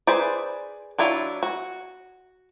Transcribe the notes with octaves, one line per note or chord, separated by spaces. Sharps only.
G#4 B4 C5 D5
F#3 D4 E4 F4
F#4